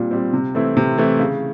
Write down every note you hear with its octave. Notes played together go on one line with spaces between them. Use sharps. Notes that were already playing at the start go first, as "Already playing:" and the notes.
Already playing: A#2 G3 C4
G3 C4
C3
E3 A3 C4 E4
C3
E3 A3 C4 E4
C#3